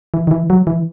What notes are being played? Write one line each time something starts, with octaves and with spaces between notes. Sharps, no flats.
E3
D#3
E3
F#3
E3